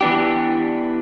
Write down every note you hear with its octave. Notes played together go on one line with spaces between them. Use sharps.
E3 B3 D4 G4